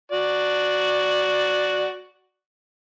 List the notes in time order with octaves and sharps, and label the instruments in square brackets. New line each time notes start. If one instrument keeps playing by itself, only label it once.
[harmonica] F#4 D5